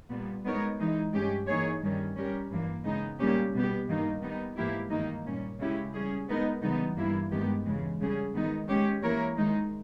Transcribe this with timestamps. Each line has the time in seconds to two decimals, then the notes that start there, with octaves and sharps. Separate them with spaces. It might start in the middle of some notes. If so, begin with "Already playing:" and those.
0.10 A#2 G3 B3
0.44 G#3 B3 D#4 A#4 C#5
0.79 E3 G#3 D#4
1.13 G2 E3 G#3 C#4 G4
1.47 E3 A#3 D#4 G#4 C#5
1.82 G2 D#3 G3 C#4
2.16 G3 C#4 G4 A#4
2.50 G2 E3 A#3
2.84 C#3 G#3 B3 D#4
3.19 A#2 G3 A#3 C#4 G4
3.53 B2 G3 B3 G4
3.87 G2 D#3 A#3 D#4
4.22 D#3 G3 B3 D#4
4.56 G#2 E3 A#3 E4 G4
4.90 G2 D#3 A#3 D#4
5.25 A#2 G3 C#4
5.59 C#3 G#3 C#4 E4 G4
5.93 G3 C#4 G#4
6.28 G#3 B3 D#4 A#4
6.62 C#3 E3 G3 B3 D#4
6.96 G2 E3 G3 A#3 E4
7.31 G2 D#3 G#3 B3 G4
7.65 E2 C#3 E3 G#3
7.99 C#3 G3 C#4 G#4
8.34 G#2 D#3 G#3 B3 D#4
8.68 G#3 C#4 G4 C#5
9.03 E3 A#3 E4 A#4 C#5
9.37 D#3 G#3 D#4